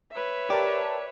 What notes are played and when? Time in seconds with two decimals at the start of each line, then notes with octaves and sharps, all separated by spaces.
0.12 B4 C#5 E5
0.50 G4 A#4 D5 A5